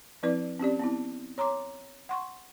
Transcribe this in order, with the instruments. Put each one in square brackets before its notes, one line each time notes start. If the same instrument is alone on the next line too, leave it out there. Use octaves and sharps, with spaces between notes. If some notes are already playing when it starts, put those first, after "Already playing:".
[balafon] F3 C4 E4 B4 D5
C4 C#4 G4 D5
B3 C4 E4
C#5 A#5 C6 D6
F#5 C6 C#6